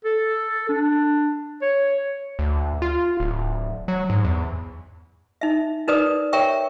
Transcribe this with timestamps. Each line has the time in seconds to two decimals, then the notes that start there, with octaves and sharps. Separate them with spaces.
0.05 A4
0.69 D4
1.62 C#5
2.39 D2
2.82 F4
3.20 D1
3.88 F#3
4.10 G#2
4.25 E2
5.41 D#4 E5
5.88 D#4 A#4 B4 D5 D#6
6.33 A#4 C#5 E5 G5 C#6